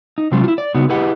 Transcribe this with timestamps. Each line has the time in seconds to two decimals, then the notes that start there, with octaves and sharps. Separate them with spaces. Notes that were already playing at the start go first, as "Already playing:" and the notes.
0.18 D#4
0.32 C3 F#3 G#3 C#4 F4
0.44 E4 F4
0.58 D5
0.75 C#3 B3 D#4 F#4
0.89 E4 G4 G#4 B4 D#5 F#5